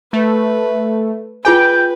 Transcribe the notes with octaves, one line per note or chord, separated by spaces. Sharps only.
A3 B4
F4 G#4 B4 G5 G#5 G6